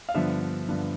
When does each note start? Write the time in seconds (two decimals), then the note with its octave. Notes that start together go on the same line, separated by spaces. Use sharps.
0.09 F5
0.14 G2 D3 F3 B3 E5
0.68 G2 D3 F3 B3